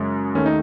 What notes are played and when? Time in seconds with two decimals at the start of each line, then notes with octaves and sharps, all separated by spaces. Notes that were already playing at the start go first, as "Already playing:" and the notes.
Already playing: F#2 C#3 G#3
0.35 D#2 D#3 A3 C#4
0.46 D#4